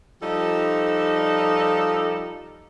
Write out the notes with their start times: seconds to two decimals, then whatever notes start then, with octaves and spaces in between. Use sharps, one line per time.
0.22 F3 G3 D#4 A4